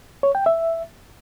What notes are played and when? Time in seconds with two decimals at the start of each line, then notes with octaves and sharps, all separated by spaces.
0.23 C#5
0.35 G5
0.46 E5